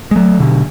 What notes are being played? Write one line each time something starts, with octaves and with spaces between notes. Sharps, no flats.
G#3
F#3 A3
B2 D3